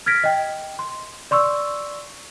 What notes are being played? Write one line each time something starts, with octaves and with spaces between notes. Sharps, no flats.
F6 G#6 A#6 B6 D7
D#5 G5
C6
D5 C6 C#6 E6